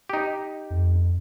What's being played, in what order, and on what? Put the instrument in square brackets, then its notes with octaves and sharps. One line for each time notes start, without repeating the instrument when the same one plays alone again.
[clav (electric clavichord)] D#4 G4
[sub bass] F2